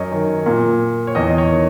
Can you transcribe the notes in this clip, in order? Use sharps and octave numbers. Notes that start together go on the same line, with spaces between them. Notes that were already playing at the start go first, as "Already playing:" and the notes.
Already playing: F#2 C#5 D#5
D#3
A#2
C#5
E2 D#5
D#5
C#5
D#3